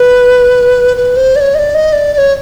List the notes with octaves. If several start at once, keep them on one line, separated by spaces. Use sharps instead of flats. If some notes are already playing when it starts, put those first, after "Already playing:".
Already playing: B4
B4
C5
D5
C#5
D#5
D5
D#5
D5
D5
C#5